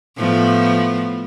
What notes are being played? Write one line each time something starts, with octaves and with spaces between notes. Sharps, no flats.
A2 F3 B3